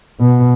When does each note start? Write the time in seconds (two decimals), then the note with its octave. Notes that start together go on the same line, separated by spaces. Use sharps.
0.20 B2